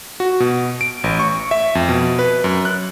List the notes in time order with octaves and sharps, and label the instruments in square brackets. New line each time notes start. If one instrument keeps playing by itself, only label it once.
[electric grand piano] F#4
B2
D7
A1
C#6
E5
F2
B2
B4
F#2
F#6